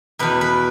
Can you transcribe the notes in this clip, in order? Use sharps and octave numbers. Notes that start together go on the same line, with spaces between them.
E2 B2 B4
B4